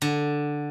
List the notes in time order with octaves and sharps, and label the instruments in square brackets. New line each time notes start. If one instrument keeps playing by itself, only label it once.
[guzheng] D3